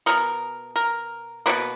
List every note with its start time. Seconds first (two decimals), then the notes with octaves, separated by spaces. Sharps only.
0.06 B2 G#3 B3 A#4
0.76 A#4
1.46 B2 G3 A#3 B4